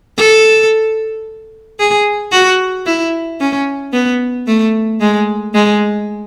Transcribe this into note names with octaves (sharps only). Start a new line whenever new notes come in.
A4
G#4
F#4
E4
C#4
B3
A3
G#3
G#3